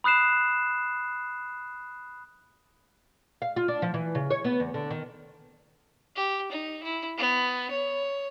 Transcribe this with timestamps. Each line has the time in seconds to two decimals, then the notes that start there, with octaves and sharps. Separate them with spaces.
0.04 B5 D#6 F#6 C7 E7
3.42 F5
3.56 F4
3.68 D4
3.82 F3
3.94 E3
4.15 C#3
4.30 C#5
4.44 B3
4.60 E2
4.74 D3
4.90 D#3
6.16 G4
6.52 D#4
6.83 E4
7.18 B3
7.70 C#5